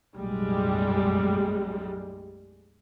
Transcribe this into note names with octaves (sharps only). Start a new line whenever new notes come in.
B1 F#2 A2 G3 G#3